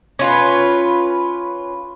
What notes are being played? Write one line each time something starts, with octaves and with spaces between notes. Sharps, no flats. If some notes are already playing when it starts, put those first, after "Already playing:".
C#4 F4 B4